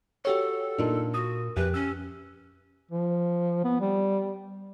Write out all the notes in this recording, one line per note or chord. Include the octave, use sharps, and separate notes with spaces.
F#4 G4 A4 C#5
A#2 D4 D#4 F4 A5
F#4 D#6
F2 G4 B4
C#4 E6
F3
B3
G3